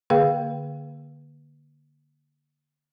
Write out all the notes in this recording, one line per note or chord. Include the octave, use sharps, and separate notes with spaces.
D3 A#3 G#4 B4 F5 G5